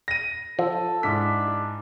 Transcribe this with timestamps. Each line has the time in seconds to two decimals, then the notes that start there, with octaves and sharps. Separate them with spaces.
0.08 A#6 D#7
0.59 F3 A4
1.03 G#2 D4 E4 B6